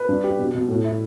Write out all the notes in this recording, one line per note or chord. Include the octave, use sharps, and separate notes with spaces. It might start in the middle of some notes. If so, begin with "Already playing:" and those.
Already playing: B4
G2
G4
B2
B2
A2
E4